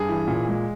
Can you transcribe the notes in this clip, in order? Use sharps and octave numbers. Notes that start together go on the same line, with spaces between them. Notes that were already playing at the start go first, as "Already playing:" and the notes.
Already playing: G2 G#4
E3
A#2
G#3